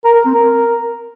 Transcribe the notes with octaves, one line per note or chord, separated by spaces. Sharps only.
A#4
A#4
C4
A#4